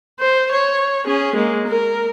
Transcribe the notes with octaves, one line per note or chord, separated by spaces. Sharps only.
C5
C#5
C#4 G#4
G#3 A#3
A#4